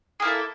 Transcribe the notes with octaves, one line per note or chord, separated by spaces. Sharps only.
A#3 E4 G#4 A4